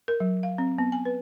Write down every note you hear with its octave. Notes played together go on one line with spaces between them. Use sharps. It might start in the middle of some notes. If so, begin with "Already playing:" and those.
A#4
F#3
F5
C4
B3
G#5
B4